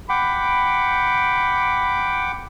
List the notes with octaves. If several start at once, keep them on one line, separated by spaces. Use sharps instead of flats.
F#5 G5 B5 D6